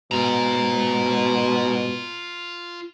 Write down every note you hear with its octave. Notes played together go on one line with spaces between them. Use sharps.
G#2 B2 F4 A#5